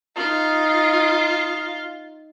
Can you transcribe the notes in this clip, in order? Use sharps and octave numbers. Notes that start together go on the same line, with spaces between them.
D#4 F4 D#5